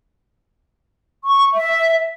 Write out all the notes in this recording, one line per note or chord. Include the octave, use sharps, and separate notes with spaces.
C#6
E5